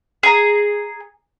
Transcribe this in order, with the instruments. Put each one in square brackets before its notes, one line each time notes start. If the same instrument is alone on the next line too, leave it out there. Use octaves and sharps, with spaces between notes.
[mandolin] G#4 A#5